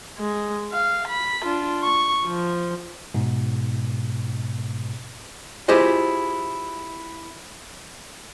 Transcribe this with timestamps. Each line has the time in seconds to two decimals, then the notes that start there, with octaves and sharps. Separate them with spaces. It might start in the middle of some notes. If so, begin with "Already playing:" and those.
0.19 G#3
0.72 F5
1.08 B5
1.45 D4 F4
1.83 C#6
2.24 F3
3.14 G#2 B2
5.68 E4 F4 G4 G#4 C5 D#5